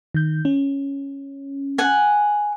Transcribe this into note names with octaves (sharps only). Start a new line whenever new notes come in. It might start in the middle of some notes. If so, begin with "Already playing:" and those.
D#3 G6
C#4
F#5 G#5